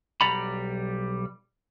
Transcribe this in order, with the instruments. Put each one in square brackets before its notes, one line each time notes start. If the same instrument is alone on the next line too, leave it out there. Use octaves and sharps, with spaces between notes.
[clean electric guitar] B1 G3 D5 F#5 A#5 B5